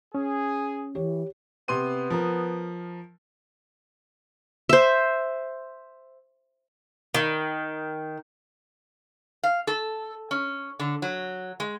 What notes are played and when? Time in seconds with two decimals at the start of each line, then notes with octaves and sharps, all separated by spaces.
0.15 C#4 G#4
0.95 E3 G4 C#5
1.68 C3 B3 C6 D#7
2.10 F3 A#4
4.69 C5 E5
7.14 D#3
9.43 F5
9.67 A4
10.31 C#4
10.80 D3
11.02 F#3
11.60 G#3